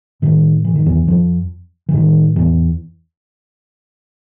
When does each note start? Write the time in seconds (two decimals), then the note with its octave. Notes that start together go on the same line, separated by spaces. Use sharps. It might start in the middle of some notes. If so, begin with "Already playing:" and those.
0.22 A2 D#3
0.65 E3
0.75 D#3
0.86 E2 E3
1.07 F2 F3
1.89 E3
1.94 A2 D#3
2.36 E2 E3